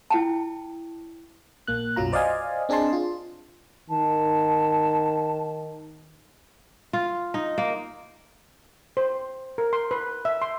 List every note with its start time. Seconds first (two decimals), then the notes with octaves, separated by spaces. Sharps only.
0.10 E4 G5 A5
1.67 A#1 A#3 F#6
1.96 B1 F#2 F#3 F4 A#5
2.12 C5 D5 D#5 F5 G#5
2.69 C4 D4 G#4 D#5 A5 C6
2.93 F4
3.90 D#3 A5
6.93 F4
7.34 D#4
7.58 A#3
8.97 C5
9.58 A#4
9.73 C6
9.91 B4
10.25 E5
10.42 C6